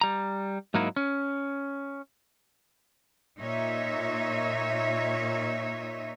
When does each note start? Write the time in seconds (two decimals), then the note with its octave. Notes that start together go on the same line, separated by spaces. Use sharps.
0.01 G3 A#5
0.74 G#2 F#3 A#3 D#4 E4
0.96 C#4
3.39 A#2 D#4 C#5 E5